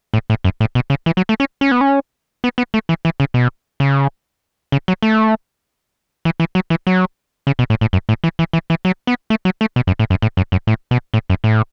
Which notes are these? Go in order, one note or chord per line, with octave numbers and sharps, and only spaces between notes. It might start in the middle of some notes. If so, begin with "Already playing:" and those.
A2
A2
F#2
A2
B2
C#3
E3
F#3
A3
C#4
C#4
B3
C#4
B3
B3
A3
E3
E3
C#3
B2
C#3
C#3
F#3
A3
E3
E3
F#3
E3
F#3
C#3
B2
A2
A2
F#2
A2
E3
E3
E3
E3
F#3
B3
A3
F#3
A3
B2
F#2
A2
F#2
A2
F#2
F#2
A2
B2
A2
F#2
A2